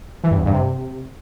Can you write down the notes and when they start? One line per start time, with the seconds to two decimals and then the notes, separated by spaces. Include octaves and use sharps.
0.24 E3
0.31 G2
0.38 E2
0.46 G2
0.53 C3